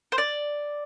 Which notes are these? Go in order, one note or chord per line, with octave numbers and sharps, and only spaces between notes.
C5
D5